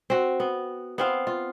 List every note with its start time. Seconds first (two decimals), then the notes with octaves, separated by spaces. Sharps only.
0.10 C4 F#4
0.40 B3
0.98 B3 C4 F5
1.27 F4